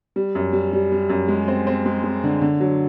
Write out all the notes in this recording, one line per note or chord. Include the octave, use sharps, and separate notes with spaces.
G3
F#2
G3
G3
G3
F#2
G#3
C4
C4
G#3
G#3
D3
D3
F#3